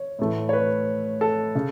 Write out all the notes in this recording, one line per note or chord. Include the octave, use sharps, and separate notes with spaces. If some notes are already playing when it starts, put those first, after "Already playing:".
Already playing: C#5
A2 E3 A3
C#5
B4
A4
C#3